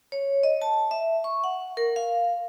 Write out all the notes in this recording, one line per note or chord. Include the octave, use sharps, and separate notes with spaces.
C#5
D#5
A5
E5
C#6
F#5
A#4
F5